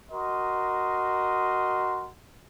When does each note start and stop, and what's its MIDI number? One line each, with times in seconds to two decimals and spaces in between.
0.11 2.08 66
0.11 2.08 70
0.11 2.08 75
0.11 2.08 84